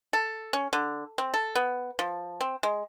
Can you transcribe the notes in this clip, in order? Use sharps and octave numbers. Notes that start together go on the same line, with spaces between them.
A4
C#4
D3
C4
A4
B3
F3
C4
G#3